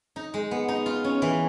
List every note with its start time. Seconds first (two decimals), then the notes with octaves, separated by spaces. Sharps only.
0.16 D#4
0.34 G#3
0.51 B3
0.68 D#4
0.86 F4
1.04 C#4
1.22 E3